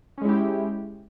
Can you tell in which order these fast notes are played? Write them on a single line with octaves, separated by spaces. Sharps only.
C#4 G#3 E4 G4